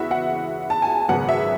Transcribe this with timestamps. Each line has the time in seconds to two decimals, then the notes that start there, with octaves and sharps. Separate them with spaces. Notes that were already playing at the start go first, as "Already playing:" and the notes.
Already playing: E2 C#3 G#3 B3 E4 F#4 E5
0.11 F#5
0.70 A5
0.82 G#5
1.09 G#1 F#2 C#3 G#3 B3 F#5
1.29 E5